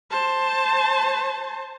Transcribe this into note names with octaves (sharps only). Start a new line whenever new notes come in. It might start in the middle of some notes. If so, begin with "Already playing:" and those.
C5 A5